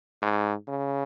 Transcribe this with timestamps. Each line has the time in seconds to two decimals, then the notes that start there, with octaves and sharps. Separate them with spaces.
0.22 G#2
0.68 C#3